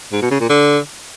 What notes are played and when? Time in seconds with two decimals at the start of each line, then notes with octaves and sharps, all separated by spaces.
0.12 G#2
0.22 B2
0.31 C#3
0.40 A#2
0.49 D3